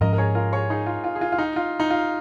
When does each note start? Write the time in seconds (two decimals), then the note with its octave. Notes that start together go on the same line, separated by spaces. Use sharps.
0.01 G#2 F3 C#4 A#4 D#5
0.13 A#4
0.18 G#4 C#5
0.35 F4 A#4
0.52 G#4 C#5
0.70 D#4 G#4
0.86 F4
1.04 F4
1.15 G#4
1.21 F4
1.32 F4
1.38 D#4
1.56 F4
1.80 D#4
1.90 F4